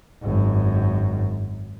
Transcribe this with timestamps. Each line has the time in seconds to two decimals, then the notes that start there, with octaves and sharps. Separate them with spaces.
0.23 G#1 F#2